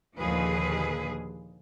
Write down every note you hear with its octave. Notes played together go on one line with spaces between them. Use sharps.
D#2 A#2 D3 F3 G#4 B4